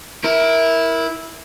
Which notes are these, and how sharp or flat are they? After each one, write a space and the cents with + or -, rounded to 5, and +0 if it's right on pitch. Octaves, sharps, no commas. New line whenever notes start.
E4 -10 A#4 +10